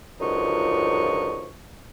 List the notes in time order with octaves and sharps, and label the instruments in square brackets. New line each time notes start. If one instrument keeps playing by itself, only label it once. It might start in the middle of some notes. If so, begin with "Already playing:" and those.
[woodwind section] C#2 F#2 D3 F3 D#4 C#6